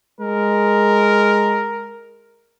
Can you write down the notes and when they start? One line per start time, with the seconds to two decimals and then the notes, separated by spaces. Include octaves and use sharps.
0.21 G#3 A#4